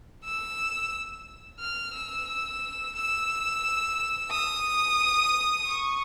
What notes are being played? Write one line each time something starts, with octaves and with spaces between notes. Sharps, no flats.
E6
F6
E6
E6
D#6
C#6